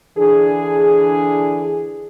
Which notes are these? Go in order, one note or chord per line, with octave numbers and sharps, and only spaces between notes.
D3 E3 D4 G#4